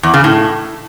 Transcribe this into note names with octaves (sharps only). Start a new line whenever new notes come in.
E2
C#3
A2